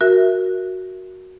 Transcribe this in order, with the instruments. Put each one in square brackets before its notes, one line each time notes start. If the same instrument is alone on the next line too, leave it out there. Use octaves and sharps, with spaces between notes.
[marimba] F#4 A#4 E5